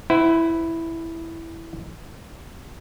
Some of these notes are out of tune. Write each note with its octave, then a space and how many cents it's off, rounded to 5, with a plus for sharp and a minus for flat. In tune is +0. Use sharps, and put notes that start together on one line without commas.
E4 +0 C5 -35 F#5 +30